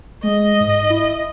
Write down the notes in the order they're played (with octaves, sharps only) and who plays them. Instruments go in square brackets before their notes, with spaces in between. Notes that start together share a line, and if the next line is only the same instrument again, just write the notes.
[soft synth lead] G#3 [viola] D#5
[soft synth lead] G#2
E4